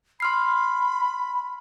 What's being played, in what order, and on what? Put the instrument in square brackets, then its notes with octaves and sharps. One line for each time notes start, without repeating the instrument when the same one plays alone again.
[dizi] B5 [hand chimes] C6 F6 C7